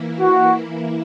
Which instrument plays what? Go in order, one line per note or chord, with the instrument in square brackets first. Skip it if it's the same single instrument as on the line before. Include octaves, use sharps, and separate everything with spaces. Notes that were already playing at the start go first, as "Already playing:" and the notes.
Already playing: [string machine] E3 A#3 E4
[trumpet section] F#4